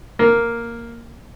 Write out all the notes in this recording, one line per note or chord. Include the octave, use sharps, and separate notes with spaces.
A#3